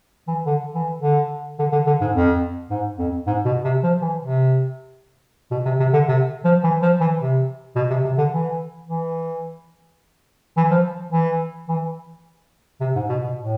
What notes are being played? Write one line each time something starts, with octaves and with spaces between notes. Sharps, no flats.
E3
D3
E3
D3
D3
D3
D3
G#2
F2
G#2
F2
G#2
B2
C3
F3
E3
C3
B2
C3
C3
D3
C3
F3
E3
F3
E3
C3
B2
C3
C3
D3
E3
E3
E3
F3
E3
E3
C3
G#2
B2
B2
A2